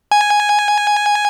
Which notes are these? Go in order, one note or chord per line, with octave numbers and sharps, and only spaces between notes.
G#5